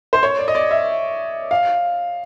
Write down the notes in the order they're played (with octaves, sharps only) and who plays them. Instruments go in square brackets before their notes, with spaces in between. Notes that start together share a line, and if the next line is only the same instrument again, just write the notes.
[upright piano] C5
C#5
D5
D#5
D5
E5
F5